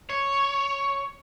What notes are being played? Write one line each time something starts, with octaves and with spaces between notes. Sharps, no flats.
C#5